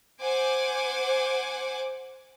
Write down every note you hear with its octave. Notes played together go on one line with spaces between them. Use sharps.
C5 F#5 G#5 D6